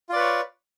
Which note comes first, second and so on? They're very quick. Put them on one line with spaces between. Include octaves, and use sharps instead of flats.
F4 D5 B4 C#5